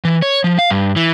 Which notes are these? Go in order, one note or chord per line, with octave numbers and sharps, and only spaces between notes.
E3
C#5
F3
F5
G2
E3